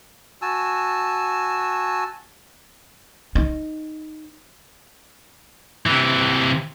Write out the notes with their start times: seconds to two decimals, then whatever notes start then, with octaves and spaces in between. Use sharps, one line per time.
0.42 F#4 G#5 A5 E6
3.35 D#4
5.86 C3 E3